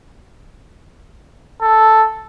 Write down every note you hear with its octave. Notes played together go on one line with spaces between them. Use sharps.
A4